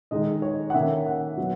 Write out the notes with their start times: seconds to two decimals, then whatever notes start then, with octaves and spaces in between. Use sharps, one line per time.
0.11 D#3 G#3 D#4 D#5
0.42 C#5
0.70 F#5
0.74 D#3 A#3 C#4 E5
1.07 F#5
1.37 F#3 B3